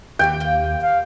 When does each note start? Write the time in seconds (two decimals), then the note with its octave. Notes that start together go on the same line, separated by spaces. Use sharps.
0.19 D#2 E3 F#4 G4 F5 G5
0.40 A#3 F4
0.82 F5